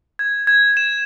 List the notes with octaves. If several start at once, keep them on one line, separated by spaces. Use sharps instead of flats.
G#6
G#6
E7